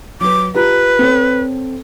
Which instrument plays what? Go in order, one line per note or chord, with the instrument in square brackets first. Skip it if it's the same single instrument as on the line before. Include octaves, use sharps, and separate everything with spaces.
[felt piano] F#3 B4 [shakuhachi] D6
[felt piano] F4 G4 A#5 [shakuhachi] B4
[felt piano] C4 A4 C#5